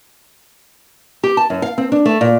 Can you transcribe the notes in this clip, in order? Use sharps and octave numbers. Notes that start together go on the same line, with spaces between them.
G4
A5
F#2
F5
C4
D4
A3
A#2